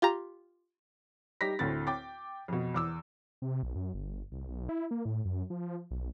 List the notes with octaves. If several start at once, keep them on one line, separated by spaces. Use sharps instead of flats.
F4 G4 A#5
G3 D#4 G4 A#6 B6
D2 A2 A3 C4 A6
G5 D6 A6
F2 B2
E2 D6 E6
C3
B1
F#2
G1
C2
B1
E4
A#3
A2
F#2
F3
B1